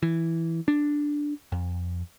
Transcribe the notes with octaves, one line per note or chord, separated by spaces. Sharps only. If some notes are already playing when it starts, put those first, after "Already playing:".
E3
D4
F2